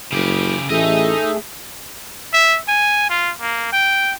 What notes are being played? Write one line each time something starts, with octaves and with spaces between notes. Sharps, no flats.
F#1 C#3 G4
A1 A3 D#4 G#4 D#5 E5
E5
G#5
F4
A#3
G5